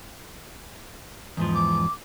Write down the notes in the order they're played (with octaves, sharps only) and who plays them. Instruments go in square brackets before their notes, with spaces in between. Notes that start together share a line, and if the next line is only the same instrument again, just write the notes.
[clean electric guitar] E2 G#2 F3
[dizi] D6